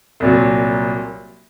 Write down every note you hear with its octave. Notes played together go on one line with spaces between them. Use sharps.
C2 A#2 F#3